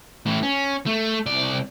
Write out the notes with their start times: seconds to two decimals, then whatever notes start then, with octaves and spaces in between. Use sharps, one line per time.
0.26 A2 E3
0.43 C#4
0.86 A3
1.26 C2 D5